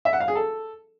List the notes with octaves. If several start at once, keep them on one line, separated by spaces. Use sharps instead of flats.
E5
F#5
F5
G#4
A4